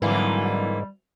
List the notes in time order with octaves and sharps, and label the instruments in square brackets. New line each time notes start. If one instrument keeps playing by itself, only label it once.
[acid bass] G#2 [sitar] D3 E3 A#3 [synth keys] F#3 C4 E4 [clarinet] G3